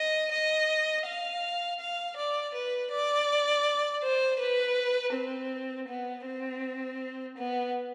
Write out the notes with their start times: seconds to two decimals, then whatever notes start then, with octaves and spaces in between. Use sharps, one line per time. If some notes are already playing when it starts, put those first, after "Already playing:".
Already playing: D#5
0.31 D#5
1.06 F5
1.79 F5
2.16 D5
2.54 B4
2.91 D5
4.03 C5
4.39 B4
5.13 C4
5.88 B3
6.25 C4
7.37 B3